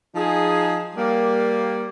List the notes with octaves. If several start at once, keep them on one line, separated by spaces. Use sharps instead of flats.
F3 D#4 G#4
G3 A#3